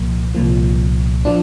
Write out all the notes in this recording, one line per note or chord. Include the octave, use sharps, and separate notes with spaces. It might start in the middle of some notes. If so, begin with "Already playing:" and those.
Already playing: C2 A#2 F3 A#3
C2 A#2 F3
F3 D4